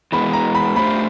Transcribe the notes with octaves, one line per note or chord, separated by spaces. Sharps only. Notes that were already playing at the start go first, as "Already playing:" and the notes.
E3 G#3 B3 B5
A#5
B5
A3 D4 G4 C5 B5